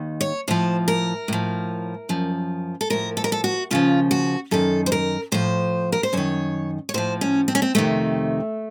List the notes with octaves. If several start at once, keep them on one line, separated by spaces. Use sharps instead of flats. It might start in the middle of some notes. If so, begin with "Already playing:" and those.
Already playing: D#2 D#3
C#5
A2 F3 C5
A#4
A2 F3
F#2 F3
A4
A2 F3 A#4
A4
A#4
A4
F#4
D#2 C#3 F3 F4
F#4
F#2 D#3 A4
C5
A#4
A2 F3 C5
A#4
C5
F#2 D#3 C#5
C#5
A2 F3 C5
C#4
C4
C#4
C4
F2 C3 D#3 A3